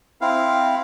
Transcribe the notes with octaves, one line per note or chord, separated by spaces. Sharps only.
C4 E4 F5